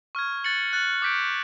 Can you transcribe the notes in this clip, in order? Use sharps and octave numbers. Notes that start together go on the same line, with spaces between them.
C#6 F6 G#6
F#6 A6 C#7 F#7
F#6 A6 C#7 F#7
D6 G6 B6 D7